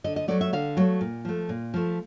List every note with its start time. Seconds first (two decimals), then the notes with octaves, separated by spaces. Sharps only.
0.04 D3 D#5
0.16 D#5
0.28 F#3 A3 D5
0.41 E5
0.53 D3 F5
0.77 F#3 A3
1.01 A#2
1.25 F3 A3
1.49 A#2
1.74 F3 A3